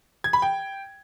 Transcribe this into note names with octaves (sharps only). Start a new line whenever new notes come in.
G#6
B5
G5